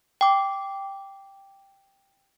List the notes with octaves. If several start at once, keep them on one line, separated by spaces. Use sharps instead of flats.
G5 D6